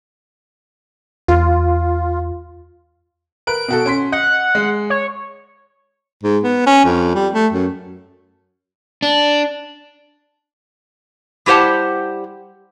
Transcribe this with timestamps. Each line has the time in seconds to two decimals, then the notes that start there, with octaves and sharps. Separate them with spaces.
1.28 E2 F4
3.47 A#4 B4 F#6 D7
3.68 B2 F#4 A4
3.86 C#4 C6 B6
4.12 D#5 F#5
4.55 G#3
4.90 C#5
6.24 G#2
6.44 B3
6.67 C#4
6.85 F2
7.15 G3
7.33 A3
7.53 F#2
9.02 D4
11.46 G3 E4 G4 C5 F#5 A5